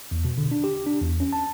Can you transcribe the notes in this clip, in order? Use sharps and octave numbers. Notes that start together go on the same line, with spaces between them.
E2
B2
D3
D4
G4
D4
E2
C#4
A5